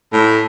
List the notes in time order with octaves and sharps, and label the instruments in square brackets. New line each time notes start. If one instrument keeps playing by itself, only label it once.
[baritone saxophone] A2